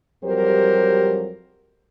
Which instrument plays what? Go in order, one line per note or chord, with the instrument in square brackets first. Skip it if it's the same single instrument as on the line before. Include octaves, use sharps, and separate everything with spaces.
[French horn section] F2 F#3 G3 G4 A#4 C5